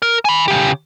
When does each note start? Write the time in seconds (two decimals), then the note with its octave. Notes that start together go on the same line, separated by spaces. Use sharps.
0.02 A#4
0.25 G#5 B5
0.48 C#3 G4